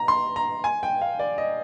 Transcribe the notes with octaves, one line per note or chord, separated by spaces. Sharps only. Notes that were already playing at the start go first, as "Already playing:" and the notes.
Already playing: A#5
C6
A#5
G#5
G5
F5
D5
D#5